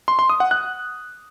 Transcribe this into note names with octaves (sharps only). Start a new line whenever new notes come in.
C6
C6
D#6
F#5
F#6